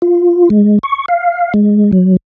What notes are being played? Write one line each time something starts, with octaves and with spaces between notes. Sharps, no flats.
F4
G#3
C#6
F5
G#3
F#3